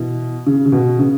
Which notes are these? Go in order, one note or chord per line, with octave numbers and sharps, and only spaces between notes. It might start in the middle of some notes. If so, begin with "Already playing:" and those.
Already playing: B2 E3
C#3
C#3
B2
C#3